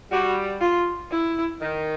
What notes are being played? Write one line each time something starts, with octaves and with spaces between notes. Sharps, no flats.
G3 F#4
F4
E4
D#3